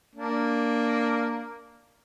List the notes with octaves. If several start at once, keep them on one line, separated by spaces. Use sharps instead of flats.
A#3 D4